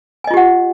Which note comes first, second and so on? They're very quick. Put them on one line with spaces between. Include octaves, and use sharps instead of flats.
G#5 D#5 F4 G4 F#5